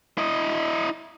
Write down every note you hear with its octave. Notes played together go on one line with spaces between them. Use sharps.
E4 D#5